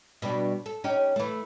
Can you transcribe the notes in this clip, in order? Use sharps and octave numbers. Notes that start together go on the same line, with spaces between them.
B2 G3 D4
A4
C#4 D#4 G4
E3 A3